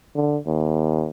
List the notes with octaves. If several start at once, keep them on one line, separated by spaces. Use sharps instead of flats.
D3
D#2